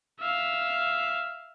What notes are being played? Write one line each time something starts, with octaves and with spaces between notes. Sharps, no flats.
E5 F5